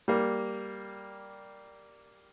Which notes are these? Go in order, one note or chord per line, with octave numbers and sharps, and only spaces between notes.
G3 A#3